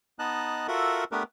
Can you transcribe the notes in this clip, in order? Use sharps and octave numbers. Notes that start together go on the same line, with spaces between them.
B3 D#4 D#5 A5 F#6
F4 F#4 A4 A#4 E5 F#5
A3 B3 D4 G4 A#4 B4